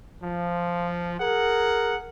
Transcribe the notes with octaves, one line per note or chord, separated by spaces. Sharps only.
F3
G#4 A#4 F#5